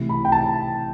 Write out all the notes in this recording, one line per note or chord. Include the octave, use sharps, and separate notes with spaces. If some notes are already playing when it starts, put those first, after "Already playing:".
Already playing: C3 E3 A3 E4
B5
G5
A5